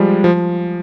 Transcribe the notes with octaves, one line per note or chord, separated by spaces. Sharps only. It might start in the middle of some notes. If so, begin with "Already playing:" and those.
Already playing: F3 G3 G#3
F3